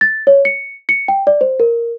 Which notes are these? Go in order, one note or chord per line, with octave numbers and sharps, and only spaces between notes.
A6
C#5
C#7
C#7
G5
D5
C5
A#4